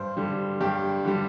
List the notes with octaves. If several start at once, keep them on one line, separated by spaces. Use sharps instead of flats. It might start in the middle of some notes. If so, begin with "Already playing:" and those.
Already playing: G2 C5
D3 G3
G2 G4
D3 G3